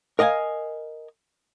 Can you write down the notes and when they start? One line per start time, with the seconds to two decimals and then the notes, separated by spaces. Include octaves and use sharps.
0.19 A#4 D#5 F5 G5 G#5